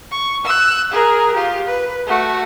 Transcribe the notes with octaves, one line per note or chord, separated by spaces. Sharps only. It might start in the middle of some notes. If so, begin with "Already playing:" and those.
C#6
E6 F#6
G#4 A#4
F4 G4
B4
A3 F#4